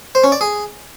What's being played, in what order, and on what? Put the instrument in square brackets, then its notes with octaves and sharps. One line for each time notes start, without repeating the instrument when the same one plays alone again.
[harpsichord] C5
C#4
D5
G#4